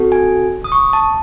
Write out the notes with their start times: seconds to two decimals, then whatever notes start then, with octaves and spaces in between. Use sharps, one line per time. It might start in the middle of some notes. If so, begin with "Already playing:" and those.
Already playing: C4 F#4 A4
0.12 G#5
0.64 D#6
0.72 C#6
0.93 A5